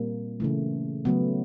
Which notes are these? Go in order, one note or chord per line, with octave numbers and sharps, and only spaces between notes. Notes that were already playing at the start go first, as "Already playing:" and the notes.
Already playing: A#2 G3 A#3 C4
C#3 E3 A3
C#3 F#3 A3 B3